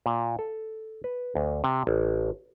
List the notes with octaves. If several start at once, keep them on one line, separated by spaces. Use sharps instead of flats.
A#2
A4
B4
D2
C3
A1